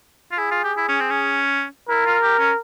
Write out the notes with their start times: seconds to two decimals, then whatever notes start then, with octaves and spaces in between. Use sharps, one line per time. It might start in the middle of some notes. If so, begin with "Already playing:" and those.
0.32 F4
0.39 E4 G#4
0.51 F4
0.64 G4
0.77 E4
0.89 C#4
1.00 C4
1.10 C#4
1.89 E4 A#4
2.06 F4
2.23 G4
2.39 C#4